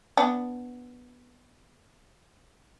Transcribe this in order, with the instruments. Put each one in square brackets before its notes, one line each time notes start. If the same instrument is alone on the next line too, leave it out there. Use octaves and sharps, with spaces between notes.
[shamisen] B3 D4